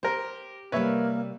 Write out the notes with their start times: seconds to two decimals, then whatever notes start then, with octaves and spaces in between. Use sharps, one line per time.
0.03 G4 A#4 C5
0.72 C3 G3 A#3 B4 C#5 E5